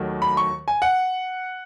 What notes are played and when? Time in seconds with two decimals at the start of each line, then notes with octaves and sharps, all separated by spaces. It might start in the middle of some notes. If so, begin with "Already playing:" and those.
Already playing: D#2 D#3 F#3 A3
0.22 B5
0.37 C#6
0.68 G#5
0.82 F#5